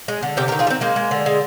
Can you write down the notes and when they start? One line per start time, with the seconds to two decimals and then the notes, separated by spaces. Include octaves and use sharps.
0.08 G#3
0.23 D3
0.37 C3 G4 A#4
0.48 G4 A#4
0.52 D#3
0.59 F4 G#4
0.67 G3
0.70 C4
0.81 G#3 A#3
0.96 G#3
1.11 D3
1.26 G#3